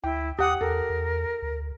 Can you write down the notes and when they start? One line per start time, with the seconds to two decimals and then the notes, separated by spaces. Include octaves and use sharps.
0.04 D2 E4 G5
0.39 D#2 G4 F#5 D#6
0.61 E2 A4 A#4
0.90 E2
1.42 D2